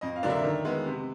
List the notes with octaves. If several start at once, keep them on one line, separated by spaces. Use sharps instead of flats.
F2 D#5
F5
D3 F#3 A#3 D4
E5
D#3
G#3 B3
C3